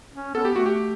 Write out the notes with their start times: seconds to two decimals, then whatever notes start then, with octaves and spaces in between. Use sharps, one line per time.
0.14 C#4
0.34 B3 A4
0.45 G4
0.55 A3 F#4
0.66 G4